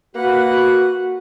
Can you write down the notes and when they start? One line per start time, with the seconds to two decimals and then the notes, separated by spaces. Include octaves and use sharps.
0.16 A#3 F#4 B4 F#5